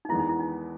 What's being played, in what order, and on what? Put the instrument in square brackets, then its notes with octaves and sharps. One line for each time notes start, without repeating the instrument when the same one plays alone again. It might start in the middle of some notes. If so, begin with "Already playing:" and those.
[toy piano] D#4
[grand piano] E2 D#3 G#3 B3 [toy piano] E4
[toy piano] D#4
E4
D#4